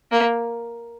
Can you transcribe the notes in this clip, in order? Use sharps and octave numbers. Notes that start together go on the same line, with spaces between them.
A#3